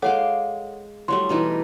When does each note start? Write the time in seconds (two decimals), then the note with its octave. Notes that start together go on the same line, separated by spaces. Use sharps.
0.02 G#3 A4 C#5 F5 F#5 D6
1.08 F#3 G3 A3 C6
1.29 B2 E3 D#4